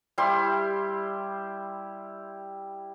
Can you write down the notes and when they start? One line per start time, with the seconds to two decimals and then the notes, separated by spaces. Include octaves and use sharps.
0.18 G3 E4 G4 C6